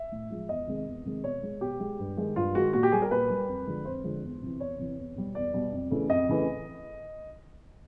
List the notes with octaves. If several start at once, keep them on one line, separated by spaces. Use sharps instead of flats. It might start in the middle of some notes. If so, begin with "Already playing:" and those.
Already playing: E5
A2
F3 G#3
E2 D#5
C3 D#3 G#3
E2
C3 D#3 G#3
B2 C#5
G#3
B2 G4
G#3
G2
D#3 G#3
G2 F4
D#3 G#3 F#4
A#2 F#4
G4
G3 G#4
A#4
A#2 B4
G3
F2
D3 F3 G#3
F2 C5
D3 F3 G#3
E2
C3 E3
E2 C#5
C3 E3
E2
B2 G3
E2 D5
B2 G3
F2
C#3 E3 A3
F2 D#5
C#3 E3 A3